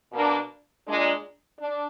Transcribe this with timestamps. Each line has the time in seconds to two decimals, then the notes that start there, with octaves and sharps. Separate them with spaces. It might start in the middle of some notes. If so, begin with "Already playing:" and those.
0.13 B2 A#3 D4
0.86 A#2 G#3 D4
1.59 D4